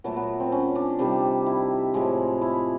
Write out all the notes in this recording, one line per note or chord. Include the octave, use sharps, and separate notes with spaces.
A#2 F#3 A3 B3
B3
C4
C#4
D4
C3 D#3 G3
E4
A2 F3 G#3
E4